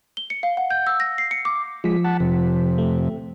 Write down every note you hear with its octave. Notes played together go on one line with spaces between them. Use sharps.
G7
C#7
F5
F#5
G6
E6
A#6
C7
C#7
D6
F3 G#3 B6
F#5 A5
F2 C3
A3